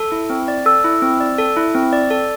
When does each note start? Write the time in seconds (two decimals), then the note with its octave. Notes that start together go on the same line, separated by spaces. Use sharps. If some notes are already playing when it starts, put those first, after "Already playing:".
Already playing: A4
0.12 E4
0.30 C4
0.48 D5
0.66 A4 E6
0.84 E4
1.02 C4
1.20 D5
1.38 A4
1.57 E4
1.75 C4
1.93 D5
2.11 A4